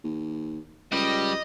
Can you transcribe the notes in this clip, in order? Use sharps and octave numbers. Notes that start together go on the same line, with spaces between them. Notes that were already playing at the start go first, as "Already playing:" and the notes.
D#2
C#2 G3 D#5